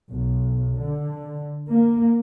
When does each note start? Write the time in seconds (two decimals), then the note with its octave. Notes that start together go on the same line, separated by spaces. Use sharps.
0.11 B1
0.78 D3
1.70 A#3